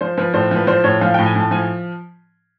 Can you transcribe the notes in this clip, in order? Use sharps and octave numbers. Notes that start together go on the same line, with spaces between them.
F3 C5
F3 B4
A2 C5
F3 B4
F3 C5
A2 C#5
F3 F5
A2 G5
G#5
A2 A5
F3 G#5